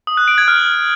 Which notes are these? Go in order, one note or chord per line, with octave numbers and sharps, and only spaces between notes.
D#6
F#6
D7
G#6
F6